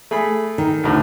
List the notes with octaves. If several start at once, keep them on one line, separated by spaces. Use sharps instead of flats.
A3 G#4 B5
D#3
D2 A2 D3